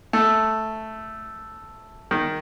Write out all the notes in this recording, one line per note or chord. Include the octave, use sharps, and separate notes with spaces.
A3
D#3